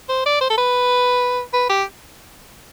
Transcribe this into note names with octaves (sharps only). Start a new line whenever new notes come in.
C5
D5
C5
A4
B4
B4
G4